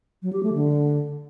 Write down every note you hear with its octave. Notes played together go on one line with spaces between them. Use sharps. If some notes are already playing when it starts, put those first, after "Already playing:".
F#3
G4
A3
D3